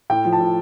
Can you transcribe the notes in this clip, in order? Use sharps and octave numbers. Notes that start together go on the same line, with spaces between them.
A2 G5
F3
A5
A2